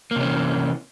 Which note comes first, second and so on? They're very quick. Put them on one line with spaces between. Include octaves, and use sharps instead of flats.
A#3 C3 C#4 E3